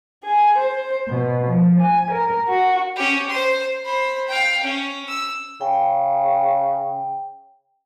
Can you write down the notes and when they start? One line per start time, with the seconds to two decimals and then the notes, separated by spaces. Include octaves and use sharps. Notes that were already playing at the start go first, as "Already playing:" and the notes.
0.25 G#4
0.57 C5
1.08 B2
1.46 F3
1.80 G#5
2.11 A#4
2.48 F#4
2.96 C#4 G4
3.29 C5 C6
3.85 C5 B5
4.28 F5 G5
4.63 C#4
5.08 E6
5.61 C#3 G5